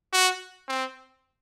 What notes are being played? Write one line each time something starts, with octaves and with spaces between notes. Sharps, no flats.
F#4
C4